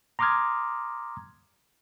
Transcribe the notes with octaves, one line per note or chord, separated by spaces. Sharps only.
A#5 C6 D6 D#6 F6 G#6